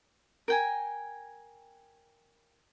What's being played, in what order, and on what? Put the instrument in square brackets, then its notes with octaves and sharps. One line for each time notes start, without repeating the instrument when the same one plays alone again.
[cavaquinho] A#4 G5 G#5